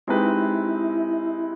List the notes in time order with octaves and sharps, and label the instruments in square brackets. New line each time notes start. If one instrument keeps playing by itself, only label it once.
[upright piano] G#3 C4 D#4 G4 B4 [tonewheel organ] E4